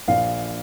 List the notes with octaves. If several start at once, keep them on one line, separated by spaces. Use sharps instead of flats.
A#1 F5